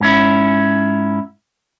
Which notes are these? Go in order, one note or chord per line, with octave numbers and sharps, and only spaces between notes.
G#2 C#4 E4